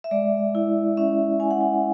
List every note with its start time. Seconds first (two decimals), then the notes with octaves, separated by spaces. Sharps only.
0.04 E5
0.11 G#3 D5
0.55 E4
0.97 C#4 E5
1.40 C#4 G#5
1.51 F#5
1.61 G#5